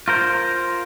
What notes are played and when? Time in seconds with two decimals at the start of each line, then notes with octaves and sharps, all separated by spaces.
0.08 F4 A#4 C5